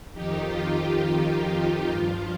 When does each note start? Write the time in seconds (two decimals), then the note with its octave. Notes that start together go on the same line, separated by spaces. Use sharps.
0.13 F2 D#3 D#4 G4
0.43 F4
0.72 D#4
1.01 F4
1.45 D#4 G4
1.89 G2 F3 F4